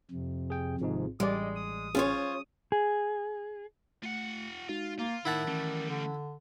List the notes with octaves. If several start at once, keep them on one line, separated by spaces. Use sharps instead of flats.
F2 C3
G#4 G5
G#1 G#2 C3 F3 G#3 D#4
A1 G3 G#3 D5 D#5
D#6
C#4 F4 G#4 C5 C#5
G#4
A3 F4 F#5
G#3 D#4 F4 F#4
A#3 F4
A2 D#3 D#4 E4 F#5 A5
E3 G3 A3 C#4
D3